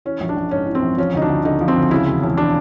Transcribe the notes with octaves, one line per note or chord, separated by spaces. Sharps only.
E3 C#4
A#1
D4
A#1
G#2 C#4
E3
C4
A#1
F3 C#4
D2 D#4
D4
D2
D3 D#4
F3
C4
D2
C#3 E4
E1
E1
D4